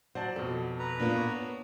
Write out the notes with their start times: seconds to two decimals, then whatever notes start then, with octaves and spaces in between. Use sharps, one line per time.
0.15 F#3 C5 D5 F#5 A5
0.36 F2 B2 A4
0.79 B4 A#5
1.00 A#2 A#3 B3 D4
1.16 C#5